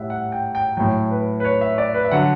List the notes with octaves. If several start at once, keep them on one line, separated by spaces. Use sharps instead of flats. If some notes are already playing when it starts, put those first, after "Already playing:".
Already playing: A2 G3 E5 F#5
F#5
G5
G5
A2 F#3 G5
B4
B4
C#5
E5
D5
B4
E5
D3 F#3 F#5